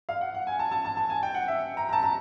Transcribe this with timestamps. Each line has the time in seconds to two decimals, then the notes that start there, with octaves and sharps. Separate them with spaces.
0.09 F5
0.21 F#5
0.34 F#5
0.47 G#5
0.59 A5
0.72 A5
0.85 A5
0.97 A5
1.10 G#5
1.23 G5
1.35 F#5
1.48 E5
1.77 A#5
1.89 A#5
1.93 A5
2.03 A#5